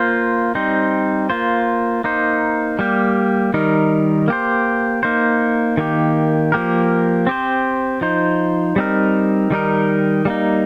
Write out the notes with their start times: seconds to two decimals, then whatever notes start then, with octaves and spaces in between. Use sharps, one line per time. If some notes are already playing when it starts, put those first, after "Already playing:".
Already playing: A#3 F4 C5
0.55 G3 C4 D#4 C5
1.30 A#3 F4 C5
2.04 A#3 D#4 C5
2.79 G3 A#3 G4
3.54 D#3 G3 D#4 A#4
4.28 A#3 G4 C5
5.03 A#3 D#4 C5
5.77 D#3 A#3 G4
6.52 F3 A#3 G4 A#4
7.27 C4 G4 C5
8.01 F3 D#4 C5
8.76 G3 C4 D#4 A#4
9.51 D#3 G3 D#4 A#4
10.25 G3 A#3 D#4